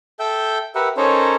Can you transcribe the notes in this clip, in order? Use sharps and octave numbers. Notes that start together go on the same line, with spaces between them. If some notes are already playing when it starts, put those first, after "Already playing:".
A4 E5 G5 G6
G4 A#4 B4 E5 F#5
C#4 D#4 A4 A#4 C5 C#5